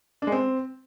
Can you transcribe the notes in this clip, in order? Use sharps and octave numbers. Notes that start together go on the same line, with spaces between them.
D4
G#3
C4